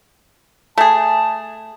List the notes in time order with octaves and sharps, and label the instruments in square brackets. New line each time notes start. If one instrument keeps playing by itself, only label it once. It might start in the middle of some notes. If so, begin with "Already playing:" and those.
[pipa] A3 G#4 [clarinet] A5